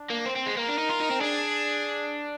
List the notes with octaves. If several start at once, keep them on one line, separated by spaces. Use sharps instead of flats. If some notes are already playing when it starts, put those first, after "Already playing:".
Already playing: D4
A#3
C4 C5
C4
G#3
A#3 A#4
D4
D#4
F4
D#4
C4
D4 G#4